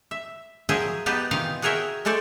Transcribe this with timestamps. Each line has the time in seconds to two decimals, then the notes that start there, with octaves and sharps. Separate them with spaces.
0.11 E5
0.69 F3 F#3 G#4 A#4 C5 E5
1.06 B3 D#4 G4 B4 A5
1.31 C3 D#3 E3 D#4 F4 F5
1.62 F#4 G#4 A#4 C#5 E5 G5
2.05 G#3 A3 A4 C5 D5